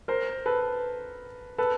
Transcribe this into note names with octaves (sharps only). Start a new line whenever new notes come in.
A#4 C5
A4 B4
A4 B4